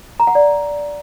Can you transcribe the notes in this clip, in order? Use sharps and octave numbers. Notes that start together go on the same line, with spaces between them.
A#5
F#5
D5